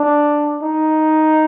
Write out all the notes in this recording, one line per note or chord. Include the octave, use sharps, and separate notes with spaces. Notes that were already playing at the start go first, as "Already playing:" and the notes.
Already playing: D4
D#4